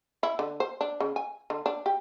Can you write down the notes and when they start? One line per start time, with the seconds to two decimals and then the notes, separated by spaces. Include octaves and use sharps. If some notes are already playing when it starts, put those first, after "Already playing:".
0.23 E4
0.39 D3
0.60 C5
0.81 D4
1.00 C#3
1.16 G#5
1.50 D3
1.66 D4
1.86 G4